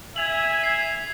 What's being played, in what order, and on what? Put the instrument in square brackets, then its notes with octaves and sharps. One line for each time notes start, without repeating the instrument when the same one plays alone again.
[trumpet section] E5 G#5 [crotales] G#6 F7 F#7
[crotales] C7